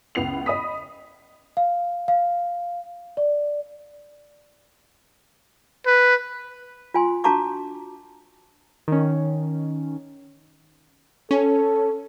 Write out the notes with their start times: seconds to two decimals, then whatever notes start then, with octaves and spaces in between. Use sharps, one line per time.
0.15 C#2 C#3 B3 E4 C7 F7
0.46 D#5 B5 D#6 B6
1.57 F5
2.08 F5
3.17 D5
5.86 B4
6.94 F4 G#5 C6
7.24 D4 F#4 A5 A#5 C#6 D6
8.88 D#3 C#4
11.31 C#4 A4